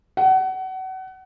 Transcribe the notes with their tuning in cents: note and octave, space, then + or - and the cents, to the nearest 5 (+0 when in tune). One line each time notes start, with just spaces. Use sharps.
F#5 +30